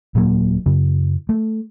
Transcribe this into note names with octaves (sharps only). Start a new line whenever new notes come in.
D#1 A#2 F#3 A#3
F#2 C#3
A3